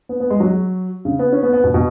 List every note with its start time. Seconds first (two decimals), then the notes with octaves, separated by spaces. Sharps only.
0.09 B3
0.20 B3
0.30 G#3
0.40 F#3
1.05 C#3
1.19 B3
1.32 C#4
1.43 B3
1.53 B3
1.64 B2
1.74 B2